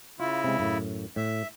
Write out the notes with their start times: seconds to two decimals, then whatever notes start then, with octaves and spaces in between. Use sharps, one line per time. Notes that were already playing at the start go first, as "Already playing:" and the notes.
0.20 C#3 E4 F4
0.44 C3 G#3
0.59 F#2 A2
1.16 A2 E5